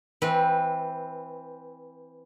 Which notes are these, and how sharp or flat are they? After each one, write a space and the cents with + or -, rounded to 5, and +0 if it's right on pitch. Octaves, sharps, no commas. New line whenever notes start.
E3 +0 C4 +0 B4 -20